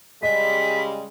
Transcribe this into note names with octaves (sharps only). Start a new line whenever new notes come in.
C#3 G3 G#3 D#5 B6